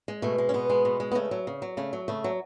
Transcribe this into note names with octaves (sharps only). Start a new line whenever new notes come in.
G#3
B2 A3
G#3
C#4
B2 B3
G#3
B2
G#3
B3
C#3 A3
F#3
C#3
F#3
C#3 A3
F#3
C#3 A3
F#3